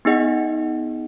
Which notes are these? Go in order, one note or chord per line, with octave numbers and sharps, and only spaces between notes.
B3 D#4 G#4 D#5 F#5